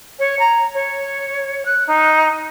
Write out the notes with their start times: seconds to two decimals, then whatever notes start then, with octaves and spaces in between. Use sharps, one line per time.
0.19 C#5
0.39 A#5
0.74 C#5
1.65 F#6
1.87 D#4